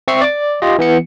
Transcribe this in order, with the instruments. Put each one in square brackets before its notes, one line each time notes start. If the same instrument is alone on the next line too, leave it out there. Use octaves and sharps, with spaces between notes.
[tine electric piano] C4 E5 C#6 C7
D5 D6
F4 G4 D#5
E3 B3 C#7